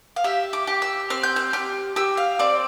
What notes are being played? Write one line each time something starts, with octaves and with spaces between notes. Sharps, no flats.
F5
G4 E5
D6
G4
E6
C4 F6
G6
F6
G4 F6
G4 E6
F5
C4 D5